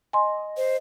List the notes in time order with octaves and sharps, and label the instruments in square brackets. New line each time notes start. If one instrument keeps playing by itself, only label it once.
[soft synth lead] D#5 [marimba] G#5 C6
[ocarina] C5